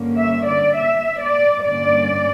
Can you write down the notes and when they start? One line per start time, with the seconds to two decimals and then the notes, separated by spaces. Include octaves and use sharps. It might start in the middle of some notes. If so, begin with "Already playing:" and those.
Already playing: G2 D3 A#3 C#4
0.18 E5
0.48 D5
0.77 E5
1.21 D5
1.65 G2 D3 A#3 C#4 D5